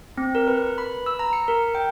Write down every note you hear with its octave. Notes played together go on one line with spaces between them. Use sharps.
C4
A#4
B4
B4
B5
E6
A#5
C#7
A#4
G5